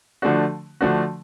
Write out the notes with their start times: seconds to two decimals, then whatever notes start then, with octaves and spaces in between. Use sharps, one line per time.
0.22 D3 F3 A3 D4 F#4
0.81 D3 F3 A3 D4 F#4